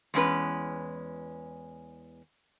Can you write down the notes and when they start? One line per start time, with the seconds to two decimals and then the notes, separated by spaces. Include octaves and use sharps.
0.14 E2 G#3 C#4 B4